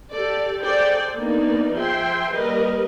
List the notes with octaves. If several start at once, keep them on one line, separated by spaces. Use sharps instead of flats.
G4 A4 D5
G#4 A4 C5 D5 G5
A#3 B3 D4 D#4 D5
F3 G#4 E5 G5 C6
G3 A#3 A#4 B4 D#5